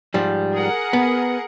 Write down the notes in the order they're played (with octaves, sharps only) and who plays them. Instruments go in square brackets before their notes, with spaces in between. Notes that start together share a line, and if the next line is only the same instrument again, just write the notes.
[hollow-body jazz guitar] G#2 F3 G3
[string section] G#4 A#4 F#5
[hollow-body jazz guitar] B3